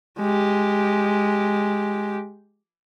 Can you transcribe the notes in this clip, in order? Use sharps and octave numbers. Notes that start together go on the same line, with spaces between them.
G#3 G4